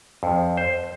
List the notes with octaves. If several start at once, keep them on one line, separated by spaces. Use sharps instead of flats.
F2
C5